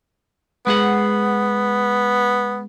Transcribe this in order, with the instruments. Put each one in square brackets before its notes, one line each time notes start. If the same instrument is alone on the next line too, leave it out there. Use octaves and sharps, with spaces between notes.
[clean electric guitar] G#3 G#4 F#5 [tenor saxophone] B3